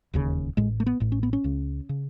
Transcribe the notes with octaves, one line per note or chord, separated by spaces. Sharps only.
E1 D#2 C#3
A1 A2 G#3
A3
B3
A1 A2
C#4
B3
C#4
C#2 C#3
C#3